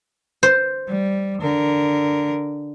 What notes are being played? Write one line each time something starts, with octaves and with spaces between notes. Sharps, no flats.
C5
G3
D3 A#4